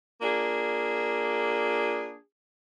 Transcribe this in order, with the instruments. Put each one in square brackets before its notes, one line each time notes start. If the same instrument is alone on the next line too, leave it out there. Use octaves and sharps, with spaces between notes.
[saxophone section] A#3 D4 F4 G#4